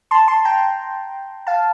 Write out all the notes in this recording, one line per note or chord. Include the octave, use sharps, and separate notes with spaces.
A5 C6
A5 C6
G5 A#5
F5 A5